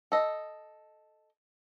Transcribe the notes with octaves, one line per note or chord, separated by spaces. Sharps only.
A4 D#5